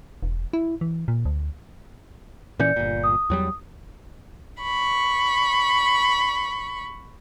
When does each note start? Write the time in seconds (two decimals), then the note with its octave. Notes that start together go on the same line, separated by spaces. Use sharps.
0.23 E1
0.53 E4
0.81 E3
1.08 A#2
1.25 D2
2.59 A#2 E3 C#4 D5 G6 C#7
2.76 G1 A#2
3.04 D#6
3.30 E2 F#3 G3
4.62 B5 C#6